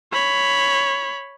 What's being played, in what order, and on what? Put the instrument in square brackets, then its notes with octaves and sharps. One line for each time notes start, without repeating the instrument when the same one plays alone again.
[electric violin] C#5 B5